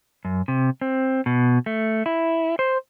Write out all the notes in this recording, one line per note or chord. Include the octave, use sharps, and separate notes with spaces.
F#2
C3
C4
B2
A3
E4
C5